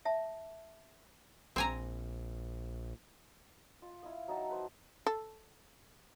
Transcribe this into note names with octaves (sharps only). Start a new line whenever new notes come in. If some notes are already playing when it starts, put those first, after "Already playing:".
E5 A5
A#1 C4 G#5 A#5
F4
E4 F5 D#6
F#3 D#4 A5
B4 C5
A4